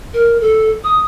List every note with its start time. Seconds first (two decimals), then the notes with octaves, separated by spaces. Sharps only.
0.14 A#4
0.41 A4
0.84 D#6